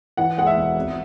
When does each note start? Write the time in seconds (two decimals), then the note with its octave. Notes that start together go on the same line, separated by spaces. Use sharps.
0.17 E3 F#5
0.38 G#3 F#5
0.47 E5
0.56 E1
0.76 G#1